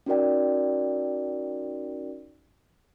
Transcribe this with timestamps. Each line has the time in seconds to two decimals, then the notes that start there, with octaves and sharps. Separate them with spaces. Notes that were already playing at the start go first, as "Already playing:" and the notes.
0.06 C#4 D#4 F#4 A#4 D5 G5